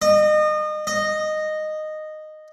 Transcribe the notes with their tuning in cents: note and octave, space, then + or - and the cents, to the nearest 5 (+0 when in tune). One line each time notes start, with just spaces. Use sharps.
D#5 -30
D#5 -10